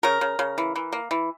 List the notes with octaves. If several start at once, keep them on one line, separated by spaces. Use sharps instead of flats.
C#3 A#4
C#3
C#3
E3
E3
A#3
E3